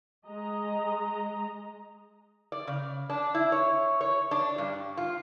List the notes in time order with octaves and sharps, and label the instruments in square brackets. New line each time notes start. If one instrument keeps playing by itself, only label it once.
[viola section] G#3 D#5 A#5
[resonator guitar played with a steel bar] D5
C#3
D4
E4
C#5
C#5
D4
G2
F4